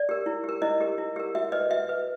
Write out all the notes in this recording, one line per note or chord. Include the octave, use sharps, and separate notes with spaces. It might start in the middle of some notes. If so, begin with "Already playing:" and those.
Already playing: D5
G4 A#4
E4
G4 A#4
E4 D#5
G4 A#4
E4
G4 A#4
F#4 E5
B4 D#5
F#4 E5
B4